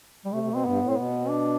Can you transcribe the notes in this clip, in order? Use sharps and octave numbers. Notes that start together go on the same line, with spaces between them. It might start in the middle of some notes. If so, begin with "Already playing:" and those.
G3
C3 A3
C3
B2
C4
G2 B3
A2
C4
B2 B3
D4